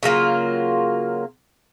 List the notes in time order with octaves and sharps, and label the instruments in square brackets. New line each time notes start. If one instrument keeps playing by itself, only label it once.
[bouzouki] C#3 F#3 A#3 F4